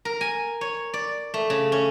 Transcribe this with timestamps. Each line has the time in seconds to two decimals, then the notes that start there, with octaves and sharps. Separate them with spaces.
0.05 A#4
0.21 G#5
0.61 C#5
0.94 D5
1.34 A3
1.50 C#3
1.72 C#4